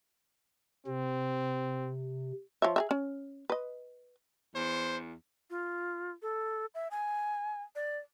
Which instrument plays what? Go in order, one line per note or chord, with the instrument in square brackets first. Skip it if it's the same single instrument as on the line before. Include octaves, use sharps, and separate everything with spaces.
[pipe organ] C3 [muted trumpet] C4
[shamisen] F3 C#5 E5
G#4 A#4 E5
C#4
B4 D#5
[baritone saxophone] E2 [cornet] C5
[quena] F4
A4
E5
G#5
D5